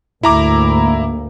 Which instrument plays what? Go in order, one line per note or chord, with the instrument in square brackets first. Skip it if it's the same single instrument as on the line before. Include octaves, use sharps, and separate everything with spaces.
[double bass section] D2 G#2 A#3 [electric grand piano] E4 A#5 D6